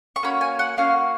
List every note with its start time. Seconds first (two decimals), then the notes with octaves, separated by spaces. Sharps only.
0.16 C#6
0.23 A#3 C#4 F#4 B5
0.41 G#5
0.59 F#5
0.77 A#3 C#4 F#4 F5